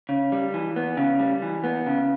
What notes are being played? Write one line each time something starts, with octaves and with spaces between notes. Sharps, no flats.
C#3
G3
E3
B3
C#3
G3
E3
B3
C#3